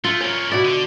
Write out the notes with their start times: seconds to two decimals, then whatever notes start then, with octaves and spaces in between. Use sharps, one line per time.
0.04 A3 F4
0.21 A#3 C#4 C#5
0.52 B2 E4 D5
0.65 D3